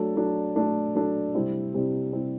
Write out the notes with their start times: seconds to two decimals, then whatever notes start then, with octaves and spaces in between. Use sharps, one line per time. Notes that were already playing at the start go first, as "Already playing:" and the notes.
Already playing: F#3 A3 D4 A4
0.16 F#3 A3 D4 A4
0.55 F#3 A3 D4 A4
0.95 F#3 A3 D4 A4
1.34 C3 G3 C4 E4
1.74 C3 G3 C4 E4
2.13 C3 G3 C4 E4